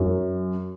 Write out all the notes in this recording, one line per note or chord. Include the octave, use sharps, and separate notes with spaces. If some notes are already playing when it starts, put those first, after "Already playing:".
Already playing: F#2 F#3